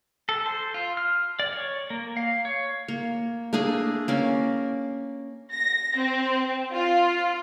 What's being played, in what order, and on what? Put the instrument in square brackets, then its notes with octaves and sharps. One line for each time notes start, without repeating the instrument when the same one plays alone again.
[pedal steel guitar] A4
C5
F4
F6
D5
C#5
A#3
F5
C#5
[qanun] A#3
A3 A#3 D4 G#4
A#3 C#4 D5
[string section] A#6
C4
F4